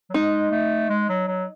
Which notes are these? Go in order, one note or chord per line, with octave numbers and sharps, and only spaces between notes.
F#3
G#3 D#4
A3
G#3
F#3
F#3